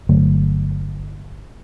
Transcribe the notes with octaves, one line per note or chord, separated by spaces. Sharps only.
G1 D3 F#3 A3